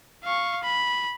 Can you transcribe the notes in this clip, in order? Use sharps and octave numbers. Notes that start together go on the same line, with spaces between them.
F5 C#6
B5